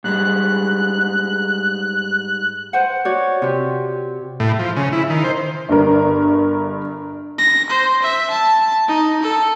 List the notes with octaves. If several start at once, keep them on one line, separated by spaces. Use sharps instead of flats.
G#2 G3 G#3 F#6
B4 C5 F#5
F#4 C#5 D5
C3 F4 G4
A2
F3
C#3
E4
D#3
C5
G1 G2 A#4
A#6
C5
E5
A5
D#4
A4